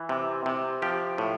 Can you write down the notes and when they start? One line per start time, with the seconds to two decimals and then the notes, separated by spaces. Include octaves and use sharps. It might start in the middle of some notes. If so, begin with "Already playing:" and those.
Already playing: E3
0.09 C3
0.46 C3
0.82 F3 G4
1.18 A2